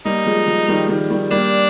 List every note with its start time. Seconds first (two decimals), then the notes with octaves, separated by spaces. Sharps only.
0.05 G3 A#3 D#4
0.26 F3 G#3
0.47 F3
0.68 D#3 G3
0.88 D#3 G3
1.10 D#3 G3
1.31 G3 A#3 D4